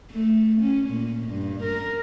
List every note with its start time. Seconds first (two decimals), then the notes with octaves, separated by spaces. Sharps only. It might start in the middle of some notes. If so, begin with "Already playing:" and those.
0.11 A3
0.61 C#4
0.89 A#2
1.29 G2
1.63 A#4